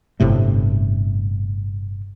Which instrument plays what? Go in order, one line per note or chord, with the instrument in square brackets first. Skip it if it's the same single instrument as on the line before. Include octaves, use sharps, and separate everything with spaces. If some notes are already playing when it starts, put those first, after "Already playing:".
[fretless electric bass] G1 A2 C3 A3